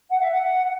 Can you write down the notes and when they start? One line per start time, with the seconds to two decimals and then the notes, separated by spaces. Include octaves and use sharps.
0.10 F#5
0.20 E5
0.31 F#5